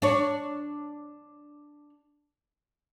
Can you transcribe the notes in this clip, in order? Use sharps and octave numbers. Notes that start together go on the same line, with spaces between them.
D4 C#5